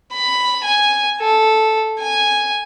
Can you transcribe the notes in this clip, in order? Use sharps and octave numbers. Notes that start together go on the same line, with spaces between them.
B5
G#5
A4
G#5